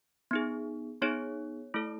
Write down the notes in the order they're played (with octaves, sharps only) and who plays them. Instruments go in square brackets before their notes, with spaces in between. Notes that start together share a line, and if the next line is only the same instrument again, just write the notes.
[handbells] B3 D#4 G#4
B3 D#4 G#4 C#5
A3 E4 A4